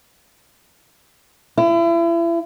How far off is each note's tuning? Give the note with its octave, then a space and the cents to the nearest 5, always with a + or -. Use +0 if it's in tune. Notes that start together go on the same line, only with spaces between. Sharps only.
E4 +35